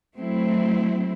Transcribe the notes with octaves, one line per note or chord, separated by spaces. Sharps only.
F#3 A3 C4 E4